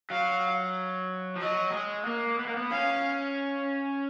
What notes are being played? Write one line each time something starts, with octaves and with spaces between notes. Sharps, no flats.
F#3 F5
F3
F#3 D#5
G#3
A#3
B3
A#3
B3
C#4 F5